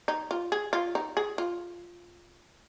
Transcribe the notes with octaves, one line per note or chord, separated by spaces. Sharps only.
D#4
F4
G#4
F4
D#4
G#4
F4